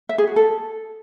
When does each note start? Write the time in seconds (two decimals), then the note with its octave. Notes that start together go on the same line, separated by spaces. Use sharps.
0.09 E5
0.18 G#4
0.27 F#4
0.36 A4